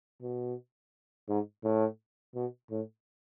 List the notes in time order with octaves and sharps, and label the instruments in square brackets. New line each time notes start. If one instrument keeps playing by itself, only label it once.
[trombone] B2
G#2
A2
B2
A2